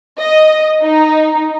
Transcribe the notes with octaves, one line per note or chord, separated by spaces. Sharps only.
D#5
D#4